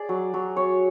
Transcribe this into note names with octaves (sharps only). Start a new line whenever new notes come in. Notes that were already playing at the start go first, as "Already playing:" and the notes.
Already playing: G#4 D5
F#3
F#3
C#5